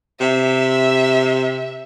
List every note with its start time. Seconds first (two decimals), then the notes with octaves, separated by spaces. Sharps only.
0.20 C3 E5